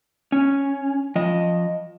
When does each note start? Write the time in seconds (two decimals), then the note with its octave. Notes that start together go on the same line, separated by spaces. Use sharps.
0.32 C#4
1.16 F3 D#5